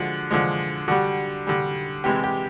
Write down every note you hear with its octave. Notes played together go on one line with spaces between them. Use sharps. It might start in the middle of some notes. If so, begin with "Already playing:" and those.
Already playing: D3 F3 G#3 F#4
D3 F3 G#3
D3 G3 F#4
D3 G3
C3 E3 G#3 G4
G4